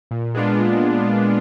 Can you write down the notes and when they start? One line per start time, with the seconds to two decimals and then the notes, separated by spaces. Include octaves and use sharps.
0.11 A#2
0.35 G#3 B3 D4 F4
0.58 A#2